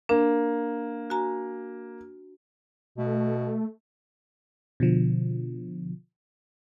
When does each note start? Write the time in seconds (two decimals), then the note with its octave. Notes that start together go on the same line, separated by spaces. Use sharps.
0.09 A#3 D4
1.10 F#4 G#5 A#5
2.98 B2 A3
4.80 B2 D3 F3